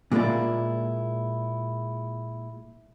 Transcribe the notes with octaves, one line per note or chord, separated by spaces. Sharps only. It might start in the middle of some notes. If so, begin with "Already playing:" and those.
A#2 G#3 A#3 E4 D5